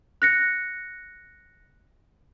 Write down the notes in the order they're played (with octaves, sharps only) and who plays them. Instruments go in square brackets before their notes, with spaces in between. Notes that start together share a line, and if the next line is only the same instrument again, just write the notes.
[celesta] F#6 A#6 C#7